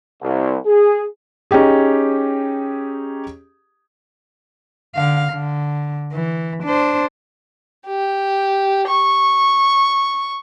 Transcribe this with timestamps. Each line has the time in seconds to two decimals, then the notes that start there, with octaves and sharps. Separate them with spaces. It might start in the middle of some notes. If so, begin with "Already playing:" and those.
0.22 C2
0.66 G#4
1.51 C#4 D#4 G4 G#4
4.95 D3 F5
5.32 D3
6.12 E3
6.64 D4 C5
7.87 G4
8.87 C#6